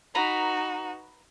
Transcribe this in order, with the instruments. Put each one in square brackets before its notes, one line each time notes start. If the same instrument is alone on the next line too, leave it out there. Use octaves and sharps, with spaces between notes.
[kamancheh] D#4 F#4 [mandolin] B4 A#5 B5